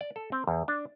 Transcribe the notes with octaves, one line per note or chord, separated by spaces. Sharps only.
D5
A4
C4
E2
D4